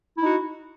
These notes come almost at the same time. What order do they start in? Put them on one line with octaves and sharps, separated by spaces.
E4 D#4 F#4